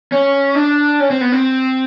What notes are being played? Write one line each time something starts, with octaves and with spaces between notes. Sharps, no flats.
C#4
D4
C#4
C4
B3
C4